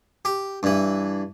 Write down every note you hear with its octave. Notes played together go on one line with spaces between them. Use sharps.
G4
G2 E3